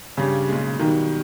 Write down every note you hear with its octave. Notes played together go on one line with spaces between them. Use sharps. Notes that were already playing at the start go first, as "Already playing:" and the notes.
G2 C#3 G3 C#4 G4
B1 A#2 G#3
B1 B2 D#3 G3